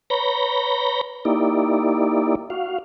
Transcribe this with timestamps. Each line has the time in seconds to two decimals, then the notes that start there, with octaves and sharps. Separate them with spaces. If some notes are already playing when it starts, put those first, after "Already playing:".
0.10 B4 C#5 A#5 B5 G6 A#6
1.25 A#3 D#4 E4 G4 D5
2.50 F#4 F5